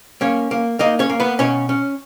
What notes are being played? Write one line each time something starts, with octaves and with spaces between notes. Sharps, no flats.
A#3 C#4 C#5
A#3
A#3 D#4 D#5
C#4 C#5
A#3
B3 B4
B2 C#4 C#5
C#4